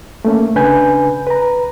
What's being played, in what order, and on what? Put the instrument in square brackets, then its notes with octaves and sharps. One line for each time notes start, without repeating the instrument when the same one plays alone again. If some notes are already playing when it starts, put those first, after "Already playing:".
[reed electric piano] A3 A#3 C#4
C#3 D4 B4 G#5 G6
B4 A#5